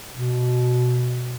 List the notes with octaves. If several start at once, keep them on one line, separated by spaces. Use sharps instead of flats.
B2